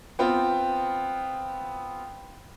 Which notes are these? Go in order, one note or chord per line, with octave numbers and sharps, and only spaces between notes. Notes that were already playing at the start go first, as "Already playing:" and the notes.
B3 C4 F4 G5